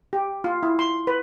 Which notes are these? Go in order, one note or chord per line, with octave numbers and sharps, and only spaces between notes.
G4
F4
E4
C6
B4